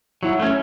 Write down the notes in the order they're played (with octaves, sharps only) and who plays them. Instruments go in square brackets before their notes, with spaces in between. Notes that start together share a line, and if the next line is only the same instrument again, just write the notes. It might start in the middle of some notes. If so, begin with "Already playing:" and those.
[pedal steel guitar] F#3 [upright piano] E4
[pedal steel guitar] A3 C#4